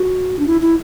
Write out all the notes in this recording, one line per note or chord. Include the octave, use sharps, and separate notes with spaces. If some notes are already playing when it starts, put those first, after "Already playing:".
Already playing: F#4
D4
E4
E4